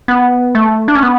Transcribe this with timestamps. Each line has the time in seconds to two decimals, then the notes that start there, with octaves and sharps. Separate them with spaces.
0.08 B3
0.55 A3
0.88 D4
0.95 C#4
1.03 B3